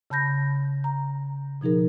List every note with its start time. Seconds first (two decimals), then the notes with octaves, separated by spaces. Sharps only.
0.10 C#3 A5 B5 G6 A#6
0.84 A#5
1.61 B2 F3 D#4 G#4 A#4